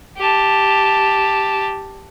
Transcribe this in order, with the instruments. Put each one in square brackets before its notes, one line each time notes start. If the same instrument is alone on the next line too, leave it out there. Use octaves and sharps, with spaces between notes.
[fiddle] G4 A5